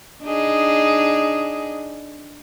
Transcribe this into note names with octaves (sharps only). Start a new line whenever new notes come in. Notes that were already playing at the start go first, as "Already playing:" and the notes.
D4 D#4 G#4